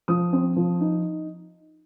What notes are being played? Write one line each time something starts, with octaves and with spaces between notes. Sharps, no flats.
F3 D#6
C4
F3
D#4